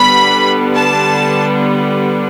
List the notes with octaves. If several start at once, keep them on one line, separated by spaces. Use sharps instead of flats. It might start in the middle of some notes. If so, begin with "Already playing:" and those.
Already playing: D3 G3 B3 B5
A5